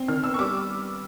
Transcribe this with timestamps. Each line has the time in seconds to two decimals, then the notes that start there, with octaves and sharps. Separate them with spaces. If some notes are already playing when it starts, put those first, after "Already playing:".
Already playing: C4
0.08 D#3 F6
0.24 B3 E6
0.34 C#6
0.39 G3 D6